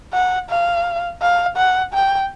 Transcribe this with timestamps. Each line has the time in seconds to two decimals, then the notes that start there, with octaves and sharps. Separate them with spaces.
0.13 F#5
0.50 F5
1.22 F5
1.57 F#5
1.94 G5